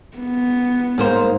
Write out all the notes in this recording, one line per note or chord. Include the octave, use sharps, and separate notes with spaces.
B3
G#2 A#3 C5